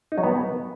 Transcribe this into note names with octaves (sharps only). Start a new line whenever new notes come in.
D#4
F#3
B3